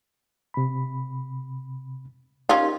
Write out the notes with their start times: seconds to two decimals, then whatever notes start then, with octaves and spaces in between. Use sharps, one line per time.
0.54 C3 B5
2.49 C#4 D#4 F4 G4 A#4